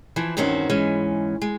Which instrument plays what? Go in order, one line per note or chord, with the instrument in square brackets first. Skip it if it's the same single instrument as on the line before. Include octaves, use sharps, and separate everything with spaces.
[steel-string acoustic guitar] E3 F3 E4
E2 G2 D#3 C4 C#4 F#4
G#2 E3 G#3 C#4
G#3